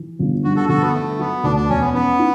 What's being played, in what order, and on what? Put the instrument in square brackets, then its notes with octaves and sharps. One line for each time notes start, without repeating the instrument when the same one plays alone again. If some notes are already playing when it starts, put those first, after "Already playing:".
Already playing: [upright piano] E3
G1
[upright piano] G2 [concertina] F#4
[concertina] F#4 A4
[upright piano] G1 [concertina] F#4 A4
[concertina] B3
[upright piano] D3 [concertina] A3
[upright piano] F#3 [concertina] B3
[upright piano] D2 [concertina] D4
[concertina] D4
[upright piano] E1 [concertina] C#4
[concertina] B3
[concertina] B3 [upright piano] C#4
[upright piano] E4